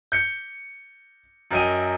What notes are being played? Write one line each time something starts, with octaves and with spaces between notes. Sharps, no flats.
G6 C#7
F#2 F#3 A#4 D#5 G5 D#7